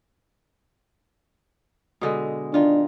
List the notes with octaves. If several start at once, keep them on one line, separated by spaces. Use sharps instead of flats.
B2 D3 G#3
D#3 D4 F4